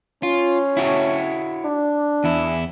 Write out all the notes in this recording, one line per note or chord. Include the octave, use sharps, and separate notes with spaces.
C#4 F4
E4 F#4 C#5
D4
E2 E4